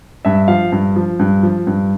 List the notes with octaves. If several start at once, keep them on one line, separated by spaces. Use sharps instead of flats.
G2 E5
F3 F5
G2
F3
G2
F3
G2